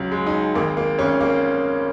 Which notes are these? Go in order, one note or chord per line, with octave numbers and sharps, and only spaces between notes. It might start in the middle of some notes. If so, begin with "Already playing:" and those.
Already playing: C#2 F#3
G#3
D#4
G#1 A#3
A#3
G#1 C#4
A#3